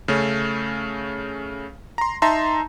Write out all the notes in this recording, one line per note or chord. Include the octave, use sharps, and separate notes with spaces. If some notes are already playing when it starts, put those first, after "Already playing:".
C#3 A3 C#4
A#5 C6
D#4 E5 A5 A#5 C6